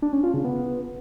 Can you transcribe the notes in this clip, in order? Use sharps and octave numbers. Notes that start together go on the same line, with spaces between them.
D4
C#4
F4
C#3
B3